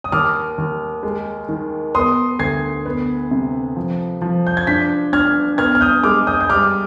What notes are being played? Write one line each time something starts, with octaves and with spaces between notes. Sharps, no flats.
D#6
D#2 D6 F6
D#2
G#3
D#3
B3 C6 D#6
D2 G#6 C7
B3
C3
F3
F3
G6
G#6
D4 G6 B6
D4 F6 G#6
B3 F6 G#6
F6
D#6 G6
G#3 D6 F6
D#6 G6
G6
G3 D6 F6